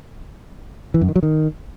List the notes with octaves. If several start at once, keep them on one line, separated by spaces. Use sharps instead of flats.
E3
F#2
D#3
F#3
D#3